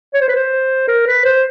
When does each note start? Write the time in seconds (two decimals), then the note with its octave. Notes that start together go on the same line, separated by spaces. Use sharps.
0.14 C#5
0.21 C5
0.28 B4
0.35 C5
0.88 A#4
1.07 B4
1.25 C5